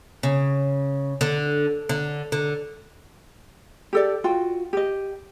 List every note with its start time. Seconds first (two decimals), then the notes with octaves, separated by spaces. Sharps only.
0.23 C#3
1.21 D3
1.89 D3
2.32 D3
3.93 G4 A4 D5
4.24 F4 F#4 G5
4.73 G4 D#5